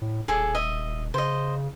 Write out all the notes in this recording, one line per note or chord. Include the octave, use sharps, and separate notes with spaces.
A2
D#1 G#4 A4 D5
D#5 E5
C#3 C5 D#5